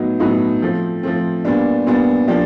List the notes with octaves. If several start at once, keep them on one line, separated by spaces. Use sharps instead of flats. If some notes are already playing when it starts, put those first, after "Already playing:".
Already playing: A2 F#3 B3 D#4 F#4
A2 F#3 B3 D#4 F#4
F3 A3 C4
F3 A3 C4
A#2 G3 B3 D4
A#2 G3 B3 D4
F3 A#3 D4 G4